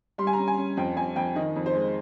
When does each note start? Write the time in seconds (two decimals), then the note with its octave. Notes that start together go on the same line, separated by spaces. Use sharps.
0.18 G3 C6
0.27 G#5
0.33 C#4 A#5
0.48 G#5
0.58 C#4
0.77 F2 G5
0.96 F2 G#5
1.16 F2 G5
1.35 D#3 D#5
1.56 F2
1.66 C5
1.75 G#3